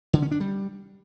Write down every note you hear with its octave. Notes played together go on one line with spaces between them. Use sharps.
D3
C#4
D4
G3